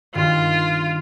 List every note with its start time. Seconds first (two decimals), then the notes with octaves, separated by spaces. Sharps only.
0.15 G2 D#3 F4